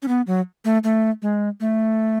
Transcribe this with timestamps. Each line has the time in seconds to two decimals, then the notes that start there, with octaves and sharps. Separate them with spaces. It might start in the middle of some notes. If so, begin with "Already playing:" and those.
0.02 C#4
0.08 B3
0.27 F#3
0.65 A3
0.84 A3
1.22 G#3
1.60 A3